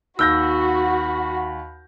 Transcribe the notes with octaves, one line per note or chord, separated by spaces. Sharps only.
D#2 F#4 B5 E6 G6 A#6